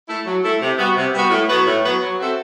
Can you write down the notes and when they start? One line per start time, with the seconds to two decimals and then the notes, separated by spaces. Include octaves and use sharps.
0.08 A3 E4 A4
0.26 F#3
0.42 A3 E4 A4
0.61 C3
0.78 G3 B3 F#4
0.96 C3
1.13 G3 B3 F#4
1.30 A2
1.48 F#3 B3 F#4 B4
1.66 A2
1.84 F#3 B3 F#4 B4
2.02 F#3
2.19 C4 F#4 A4 E5